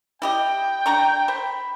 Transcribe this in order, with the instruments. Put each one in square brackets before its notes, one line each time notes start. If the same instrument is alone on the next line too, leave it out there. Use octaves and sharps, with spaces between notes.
[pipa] E4 G4 D#5 [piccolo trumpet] G5
[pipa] D4 A#5 C#6
[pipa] C5 [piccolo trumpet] B5